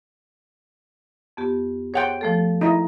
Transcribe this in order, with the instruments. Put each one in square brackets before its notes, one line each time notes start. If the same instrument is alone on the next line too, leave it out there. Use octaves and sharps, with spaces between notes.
[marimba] F2 B3 G4
[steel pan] G#4 F#5 G5 [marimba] C#5 C6
[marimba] F3 A3 A4
[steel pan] D#4 E4 D#5